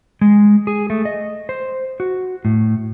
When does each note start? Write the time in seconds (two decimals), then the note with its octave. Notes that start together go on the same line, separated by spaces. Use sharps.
0.21 G#3
0.67 G#4
0.90 A3
1.05 D#5
1.49 C5
2.00 F#4
2.45 A2